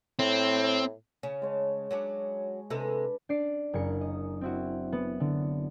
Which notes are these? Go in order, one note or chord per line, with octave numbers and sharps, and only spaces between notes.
A2 C4
C#3 C#4
G#3 C#5 A5
F#3 C#4 D4
C3 G#3 D4 A4 B4
D4 D5 C7 D7 E7
F#1 G#4 A#4 C#7
D#5
C4 E4 F#4
B3
D3